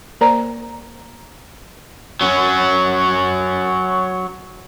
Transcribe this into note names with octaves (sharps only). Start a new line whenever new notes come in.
A#3 A#4 C5 D5 A#5
F#3 C#4